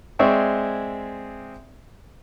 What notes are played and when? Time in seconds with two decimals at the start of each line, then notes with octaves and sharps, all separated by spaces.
0.19 G#3 C4 D5 E5 G#5 C#6